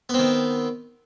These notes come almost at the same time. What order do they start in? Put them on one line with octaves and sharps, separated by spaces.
B3 C4 D#3